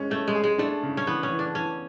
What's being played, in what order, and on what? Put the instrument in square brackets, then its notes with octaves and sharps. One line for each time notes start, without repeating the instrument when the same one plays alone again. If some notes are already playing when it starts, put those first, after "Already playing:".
Already playing: [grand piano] G#3 C#4
[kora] A3 [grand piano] C#4
[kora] G#3
[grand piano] G#4
[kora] G#3
[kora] A3 [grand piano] D4
[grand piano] C#3
[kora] C#4
[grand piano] E3 [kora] B3
[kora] C#4
[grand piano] E3
[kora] D4
[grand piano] E3 [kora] C#4